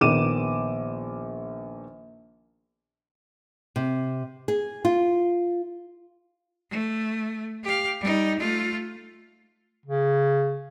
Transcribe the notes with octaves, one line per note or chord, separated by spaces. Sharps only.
A#1 D#3 B3 D6 D#7 E7
C3
G#4
F4
A3
G4 F5
G3 D#4
A3 F4
C#3